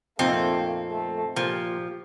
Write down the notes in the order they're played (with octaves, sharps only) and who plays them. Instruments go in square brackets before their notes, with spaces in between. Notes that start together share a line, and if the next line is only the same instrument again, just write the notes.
[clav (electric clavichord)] F2 A#2 D#4 [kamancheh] A3 A#3 [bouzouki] C4 A4
[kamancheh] A3
[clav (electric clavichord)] A#2 [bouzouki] F3 [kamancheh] G4